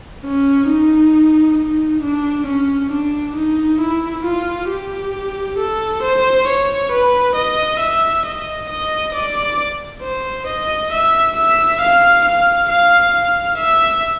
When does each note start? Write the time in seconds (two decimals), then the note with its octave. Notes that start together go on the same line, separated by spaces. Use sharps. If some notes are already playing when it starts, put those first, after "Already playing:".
0.24 C#4
0.68 D#4
1.58 D#4
2.03 D4
2.47 C#4
2.92 D4
3.36 D#4
3.81 E4
4.25 F4
4.70 G4
5.59 A4
6.03 C5
6.48 C#5
6.92 B4
7.36 D#5
7.80 E5
8.26 D#5
8.70 D#5
9.15 D5
10.02 C5
10.47 D#5
10.92 E5
11.36 E5
11.81 F5
12.25 F5
12.69 F5
13.14 F5
13.58 E5